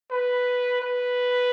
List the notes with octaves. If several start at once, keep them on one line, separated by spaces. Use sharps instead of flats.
B4
B4